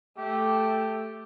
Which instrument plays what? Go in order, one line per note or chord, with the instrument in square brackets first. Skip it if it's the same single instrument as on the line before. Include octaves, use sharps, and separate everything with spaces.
[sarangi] A3 [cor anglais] G4